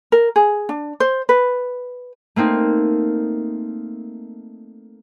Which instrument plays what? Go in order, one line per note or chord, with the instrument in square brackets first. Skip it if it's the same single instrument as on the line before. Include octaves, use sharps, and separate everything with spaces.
[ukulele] A#4
G#4
D4
C5
B4
[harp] A3 A#3 C4 D#4